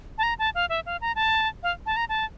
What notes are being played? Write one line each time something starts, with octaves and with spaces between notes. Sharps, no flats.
A5
A#5
A5
F5
E5
F5
A#5
A5
F5
A5
A#5
A5